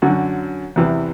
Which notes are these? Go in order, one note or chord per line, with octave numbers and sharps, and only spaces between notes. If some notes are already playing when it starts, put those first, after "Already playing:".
F#2 D3 F#3 F#4
E2 C3 E3